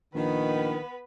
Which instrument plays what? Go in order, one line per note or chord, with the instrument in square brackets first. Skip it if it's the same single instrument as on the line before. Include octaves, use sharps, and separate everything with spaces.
[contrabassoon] A#1 [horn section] D#3 [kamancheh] B3 B4